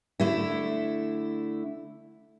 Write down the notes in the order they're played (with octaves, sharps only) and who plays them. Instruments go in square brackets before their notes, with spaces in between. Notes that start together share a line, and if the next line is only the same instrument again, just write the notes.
[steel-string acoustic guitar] D3 A3 E4